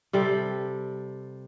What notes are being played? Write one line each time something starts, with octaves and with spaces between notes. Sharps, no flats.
C3 G3 A4